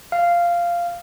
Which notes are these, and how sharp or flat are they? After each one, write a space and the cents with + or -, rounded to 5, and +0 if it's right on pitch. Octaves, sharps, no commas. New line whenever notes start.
F5 -10